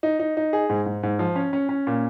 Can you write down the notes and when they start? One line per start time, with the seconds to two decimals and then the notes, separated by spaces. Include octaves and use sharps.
0.03 D#4
0.20 D#4
0.37 D#4
0.53 G#4
0.70 G#2
0.86 G#2
1.03 G#2
1.19 F3
1.36 C#4
1.53 C#4
1.69 C#4
1.87 A#2